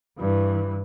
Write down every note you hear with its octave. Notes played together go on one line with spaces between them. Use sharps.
G2 E3